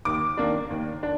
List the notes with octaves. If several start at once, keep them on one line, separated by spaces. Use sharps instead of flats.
D#2 D6
D#3 A#3 D4
D#2
D4